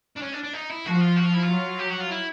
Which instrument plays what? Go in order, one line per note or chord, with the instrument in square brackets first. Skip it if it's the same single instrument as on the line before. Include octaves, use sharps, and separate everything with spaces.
[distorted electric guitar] D4
C#4
D4
D4
D#4
E4
[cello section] F3 [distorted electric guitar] F#4
[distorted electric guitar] F4
F#4
F4
E4
[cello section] F#3 [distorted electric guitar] F4
[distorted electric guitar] G4
F#4
F4
E4